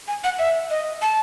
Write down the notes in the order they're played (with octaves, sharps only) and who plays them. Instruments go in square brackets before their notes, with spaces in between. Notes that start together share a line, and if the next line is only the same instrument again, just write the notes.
[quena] G#5
F#5
E5
D#5
A5